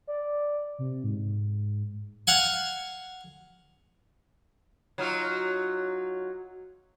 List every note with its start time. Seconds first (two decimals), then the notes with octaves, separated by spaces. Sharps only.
0.07 D5
0.79 C3
1.04 G#2
2.27 F5 F#5 G#5
4.98 F#3 D#4 F4